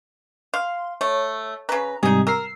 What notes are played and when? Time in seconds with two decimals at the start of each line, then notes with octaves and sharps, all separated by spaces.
0.54 F5 C6
1.01 A3 C#5
1.69 C#3 B4 A#5
2.03 G#2 C3 G3 D#4 G#4
2.27 A#4 E6 C7